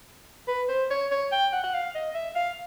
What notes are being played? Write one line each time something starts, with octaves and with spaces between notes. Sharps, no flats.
B4
C5
C#5
C#5
G5
F#5
F#5
F5
D#5
E5
F5